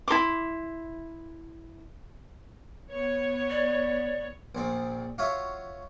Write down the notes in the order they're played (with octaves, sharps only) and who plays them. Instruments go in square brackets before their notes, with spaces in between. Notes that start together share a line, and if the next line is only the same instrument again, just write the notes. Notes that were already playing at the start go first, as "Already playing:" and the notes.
[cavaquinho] E4 A#4 C6 D6
[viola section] B3 C#5
[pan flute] D5
[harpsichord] A#1 A#2 C4
F4 F#4 C#5 E5